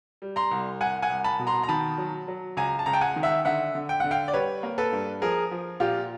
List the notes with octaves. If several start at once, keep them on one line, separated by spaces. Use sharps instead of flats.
G3
A#5 C6
C2
C2 F#5 G#5
F#5 G#5
C2
A5 B5
B2
A#5 C6
A#5
D#3 A5 B5
F#3
F#3
C#2 G#5 A#5
A5
C#2 A#5
G5 A5
F#5 G#5
D#3
E5 F#5
D3 E5 F#5
D3
G5
D3 F#5
F5 G5
D5
G3 B4 C#5
A#3
A4 B4
G2
F3 G#4 A#4
F3
A#2 F4 G4